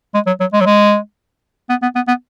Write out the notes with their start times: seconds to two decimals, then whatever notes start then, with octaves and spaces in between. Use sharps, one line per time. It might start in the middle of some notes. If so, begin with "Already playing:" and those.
0.14 G#3
0.27 F#3
0.40 F#3
0.53 G#3
0.61 F#3
0.66 G#3
1.69 B3
1.82 B3
1.95 B3
2.08 B3